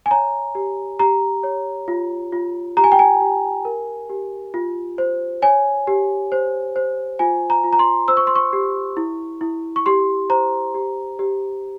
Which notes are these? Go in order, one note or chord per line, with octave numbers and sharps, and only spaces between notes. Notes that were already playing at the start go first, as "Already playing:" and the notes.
G#5
C#5 A#5
G4
G4 A#5
C#5
F4
F4
G4 A#5
G#5
G5
G#5
G4
A#4
G4
F4
C5
C#5 G#5
G4
C5
C5
F4 G#5
A#5
F4
A#5
C6
C5 E6
C#6
C6
C#6
G4
E4
E4
C#6
G4 C6
C5 A#5
G4
G4